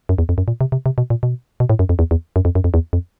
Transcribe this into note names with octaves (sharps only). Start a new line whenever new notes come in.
F#2
E2
F2
F#2
A#2
C3
C3
C3
B2
A#2
B2
B2
A2
F#2
F2
E2
E2
F#2
F2
F#2
F2
E2
F2